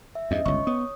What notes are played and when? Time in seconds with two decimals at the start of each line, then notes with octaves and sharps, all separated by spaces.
0.15 E5
0.31 E2 G2 C#4 D#5
0.46 G1 C#2 C#5 C#6
0.67 B3 C#5 D#6